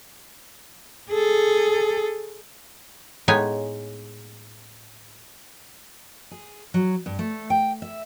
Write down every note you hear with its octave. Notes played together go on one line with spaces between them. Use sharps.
G#4 A4
A2 G#3 B3 D#4 C#5 G#5
G#4
F#3
G2
A3
G5
E5